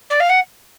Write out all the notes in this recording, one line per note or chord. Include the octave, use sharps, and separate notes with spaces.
D5
F5
F#5